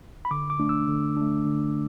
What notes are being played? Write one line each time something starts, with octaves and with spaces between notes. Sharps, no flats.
B5
D3 D6
D6
A3 D4
E6
D3
A3 D4
D3